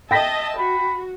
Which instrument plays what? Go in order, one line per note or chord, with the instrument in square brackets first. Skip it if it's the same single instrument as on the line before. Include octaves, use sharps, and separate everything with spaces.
[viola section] D#5 E5 A5 [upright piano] G5 A#6 B6
[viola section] F#4 [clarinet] B5